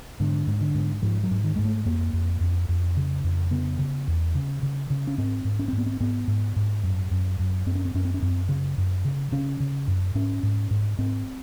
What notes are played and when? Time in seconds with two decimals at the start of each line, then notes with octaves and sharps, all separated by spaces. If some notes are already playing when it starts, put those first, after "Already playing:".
0.20 G#2 D3
0.47 G#2
0.61 D3
0.75 G#2
1.02 G#2 F3
1.23 F#3
1.31 G#2
1.44 D#3
1.56 G#2 G#3
1.65 A3
1.85 F2 A#3
2.13 F2
2.41 F2
2.69 F2
2.97 C#3
3.24 F2
3.51 C#3 B3
3.79 C#3
4.08 E2
4.35 C#3
4.63 C#3
4.90 C#3
5.07 C#4
5.18 G#2 C4
5.45 G#2
5.59 C#4
5.68 C4
5.73 G#2
5.78 B3
5.86 C4
6.00 G#2 B3
6.28 G#2
6.56 G#2
6.83 F#2
7.11 F#2
7.39 F#2
7.66 F#2 C4
7.75 C#4
7.85 C4
7.94 F#2 C#4
8.05 C4
8.14 C#4
8.22 F#2 C4
8.49 C#3
8.78 F#2
9.05 C#3
9.32 C#3 C#4
9.60 C#3
9.87 F#2
10.15 G#2 C#4
10.43 G#2
10.71 G#2
10.98 G#2 C4